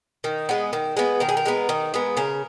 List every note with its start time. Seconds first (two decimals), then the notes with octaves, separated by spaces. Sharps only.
0.24 D#3
0.49 G#3 B3
0.73 D#3
0.97 G#3 B3
1.20 D#3 A#4
1.29 G#4
1.37 A#4
1.46 G#3 B3
1.69 D#3
1.94 G#3 B3
2.17 C#3 A#4